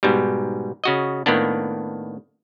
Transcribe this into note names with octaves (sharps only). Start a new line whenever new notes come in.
G#2 B2 G3
C#3 F#4 D#5
A2 D#3 A#3 B3 D4